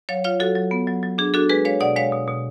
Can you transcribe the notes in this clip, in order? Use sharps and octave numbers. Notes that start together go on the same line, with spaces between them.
F#3 C#5 F5
F4 C#5 F5
F#3 F#4 A4
F#3
B3
F#3
F#3
D4 G#4
D4 F#4 A4
G#3 G#4 B4
G#3 C#5 F5
B2 D5 F#5
G#3 C#5 F5
B2
B2